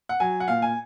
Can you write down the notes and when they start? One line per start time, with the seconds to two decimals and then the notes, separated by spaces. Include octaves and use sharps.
0.09 F#5
0.20 F#3 G#5
0.40 F#5
0.48 A#2 F5
0.62 G#5